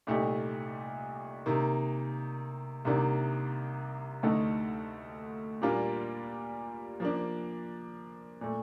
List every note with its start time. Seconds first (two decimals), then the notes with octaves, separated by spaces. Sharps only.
0.07 C2 A#2 A3 D#4 G4
1.46 C3 D#3 A#3
2.85 C2 C3 D#3 A#3 D4
4.23 D2 D3 A3 D#4 A4
5.62 A#2 G3 A#3 D4 F4
7.00 F3 A#3 D4
8.41 A#2 A3